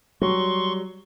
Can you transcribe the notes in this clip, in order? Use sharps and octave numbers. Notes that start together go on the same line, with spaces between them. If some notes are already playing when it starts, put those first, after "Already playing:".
F#3 G3 C6 C#6